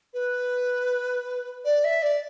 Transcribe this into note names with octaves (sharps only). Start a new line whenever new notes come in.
B4
D5
E5
D5